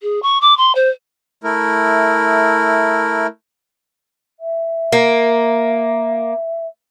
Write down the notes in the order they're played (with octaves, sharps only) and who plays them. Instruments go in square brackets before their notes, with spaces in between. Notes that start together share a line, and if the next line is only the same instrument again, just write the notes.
[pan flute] G#4
C#6
D6
C6
C5
[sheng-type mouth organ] A3 E4 A#4
[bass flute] E5
[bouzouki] A#3